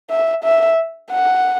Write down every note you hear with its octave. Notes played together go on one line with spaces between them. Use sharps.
E5
E5
F#5